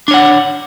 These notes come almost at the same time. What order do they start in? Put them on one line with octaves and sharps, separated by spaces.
D4 C#5 F#5